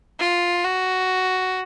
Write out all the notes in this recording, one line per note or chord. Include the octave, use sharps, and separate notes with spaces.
F4
F#4